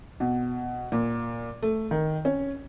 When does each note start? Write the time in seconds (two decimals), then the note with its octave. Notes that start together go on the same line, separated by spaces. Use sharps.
0.20 B2
0.92 A#2
1.63 A3
1.91 D#3
2.25 C#4